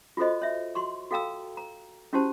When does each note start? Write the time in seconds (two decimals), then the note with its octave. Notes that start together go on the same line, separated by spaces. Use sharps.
0.17 F4 F#4 A4 C5 D#5
0.42 C#5 E5
0.75 F#4 C6 C#6
1.11 F#4 A4 F5 G5 A#5 E6
1.57 A#5
2.13 C#4 E4 F#4 G4 C5 A5